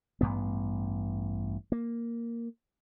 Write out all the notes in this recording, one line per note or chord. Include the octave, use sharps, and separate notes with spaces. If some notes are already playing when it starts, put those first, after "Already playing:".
A1 G2 B3
A#3